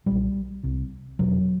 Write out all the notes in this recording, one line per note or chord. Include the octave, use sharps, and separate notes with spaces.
B1 A#2 G3
C2 C3
F1 E2 B2 F#3